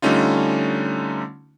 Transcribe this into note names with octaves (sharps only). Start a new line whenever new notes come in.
D3 G3 A3 C#4 D#4 F4